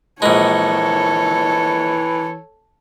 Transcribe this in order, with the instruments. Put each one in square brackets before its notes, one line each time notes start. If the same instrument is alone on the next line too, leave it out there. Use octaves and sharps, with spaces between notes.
[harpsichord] A#1 G#3 [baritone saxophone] E3 [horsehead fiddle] A4 C#5